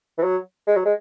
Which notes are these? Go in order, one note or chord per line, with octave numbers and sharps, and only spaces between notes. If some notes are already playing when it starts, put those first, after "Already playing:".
E3
F#3
G#3
F#3
G#3